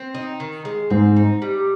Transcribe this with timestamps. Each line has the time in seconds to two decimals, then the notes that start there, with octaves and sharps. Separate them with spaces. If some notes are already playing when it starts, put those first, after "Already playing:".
Already playing: C4
0.14 D#4
0.40 D#3
0.65 G#3
0.90 G#2 C4
1.16 D#4
1.42 G3